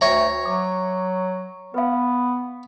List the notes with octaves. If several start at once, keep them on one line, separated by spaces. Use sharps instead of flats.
D2 C#5 E5 G5 A#5
F#3 D6
B3 B4 F5